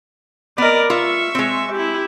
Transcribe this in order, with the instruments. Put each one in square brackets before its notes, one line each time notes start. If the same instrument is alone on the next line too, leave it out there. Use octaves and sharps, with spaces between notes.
[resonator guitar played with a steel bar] B3 D#5 [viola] A#4 D5
[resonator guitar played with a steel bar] F4 [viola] E5 C#6
[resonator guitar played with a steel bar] G#3 C4
[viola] E4 G4